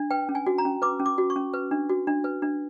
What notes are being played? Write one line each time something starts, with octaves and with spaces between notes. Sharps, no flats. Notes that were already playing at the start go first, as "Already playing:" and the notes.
Already playing: D4
B4 G5
C#4
G#5
F#4
A#5
C#4
B4 D6
C#4
D6
F#4
C#6
C#4
B4
D4
F#4
D4
B4
D4